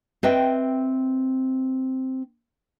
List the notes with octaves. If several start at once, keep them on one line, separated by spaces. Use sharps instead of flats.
C4 B4 D#5 E5 G5